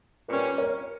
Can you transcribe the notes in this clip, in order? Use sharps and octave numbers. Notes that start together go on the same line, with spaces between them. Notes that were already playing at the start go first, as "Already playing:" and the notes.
A#2 G3 C#4 B4 D5
A#4 C#5